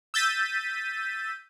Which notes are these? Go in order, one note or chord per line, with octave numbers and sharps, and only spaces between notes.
E6 G6 A6 B6 D#7